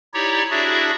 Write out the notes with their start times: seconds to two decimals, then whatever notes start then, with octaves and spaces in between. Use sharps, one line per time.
0.14 D#4 E4 G4 C#5 D5
0.51 D4 E4 F#4 G#4 D5 E5